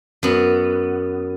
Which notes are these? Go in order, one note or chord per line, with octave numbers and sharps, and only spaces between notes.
F#2 B3